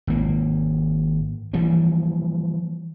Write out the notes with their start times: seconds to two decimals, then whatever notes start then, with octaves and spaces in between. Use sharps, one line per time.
0.07 G#1 A#3
1.53 E3 F3 G3 A#3